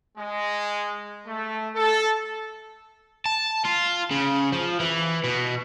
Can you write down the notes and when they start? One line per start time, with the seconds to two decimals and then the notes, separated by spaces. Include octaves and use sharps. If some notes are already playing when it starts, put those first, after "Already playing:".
0.17 G#3
1.26 A3
1.75 A4
3.26 A5
3.65 F4
4.11 C#3
4.52 F3
4.80 E3
5.24 B2